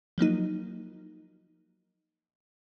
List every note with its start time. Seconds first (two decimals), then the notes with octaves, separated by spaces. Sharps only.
0.18 F3 F#3 A#3 D#4